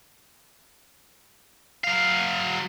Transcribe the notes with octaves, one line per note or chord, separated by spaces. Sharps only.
F#3 F5